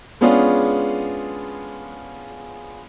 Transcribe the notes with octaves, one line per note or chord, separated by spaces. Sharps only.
G#3 B3 C#4 D4 F4 G#4